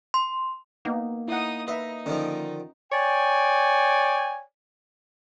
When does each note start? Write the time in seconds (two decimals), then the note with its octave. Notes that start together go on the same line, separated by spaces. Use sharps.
0.14 C6
0.85 A#3 B3 D#4
1.28 D#4 E4 F#5 D#6
1.68 D#4 B4 D#5 E5
2.06 D3 D#3 F3 C#4
2.92 C#5 D5 G5 G#5